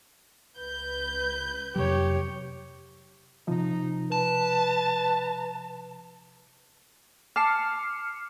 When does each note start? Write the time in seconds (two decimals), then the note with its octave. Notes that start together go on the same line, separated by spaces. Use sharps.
0.58 C#2 B4 G6
1.76 F2 C3 F#3 G4 C#5
3.48 C3 F3 D#4
4.12 B4 A5
7.36 A5 D6 F6 C7 C#7